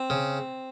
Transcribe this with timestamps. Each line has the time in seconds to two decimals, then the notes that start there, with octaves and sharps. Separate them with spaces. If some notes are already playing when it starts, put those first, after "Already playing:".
Already playing: C4
0.10 C#3